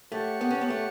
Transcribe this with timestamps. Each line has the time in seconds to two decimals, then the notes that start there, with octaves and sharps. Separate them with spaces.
0.12 A3 G4 C#5 F#5 A5
0.41 B3
0.51 C#4
0.61 B3
0.70 A3